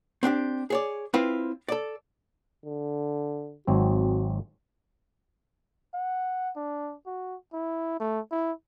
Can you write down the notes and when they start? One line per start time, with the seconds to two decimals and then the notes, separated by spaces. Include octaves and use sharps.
0.23 C4 D4 F4 G4
0.70 G#4 C#5 D5
1.14 C4 E4 F4 B4 F5
1.69 A4 D5
2.65 D3
3.67 G#1 F#3 C4 F#4
5.94 F#5
6.56 D4
7.06 F#4
7.53 E4
8.00 A3
8.31 E4